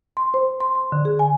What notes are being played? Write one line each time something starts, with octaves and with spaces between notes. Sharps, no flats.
C6
C5
C6
C6
D3
G#4
G#5